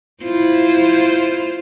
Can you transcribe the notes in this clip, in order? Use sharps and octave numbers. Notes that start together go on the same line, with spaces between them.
E4 F4 C5